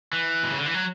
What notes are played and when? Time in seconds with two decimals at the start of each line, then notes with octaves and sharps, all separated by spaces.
0.13 E3
0.43 B2
0.50 C#3
0.58 D3
0.66 E3
0.74 F#3